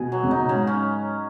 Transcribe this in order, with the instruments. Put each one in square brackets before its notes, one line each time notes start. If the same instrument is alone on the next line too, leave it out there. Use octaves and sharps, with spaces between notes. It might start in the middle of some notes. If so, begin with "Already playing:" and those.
Already playing: [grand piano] B2 [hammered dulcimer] G#4
[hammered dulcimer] F#3
[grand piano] C#3
[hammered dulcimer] D#4
[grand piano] B2
[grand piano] G#2 [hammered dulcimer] C#3
[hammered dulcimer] C#4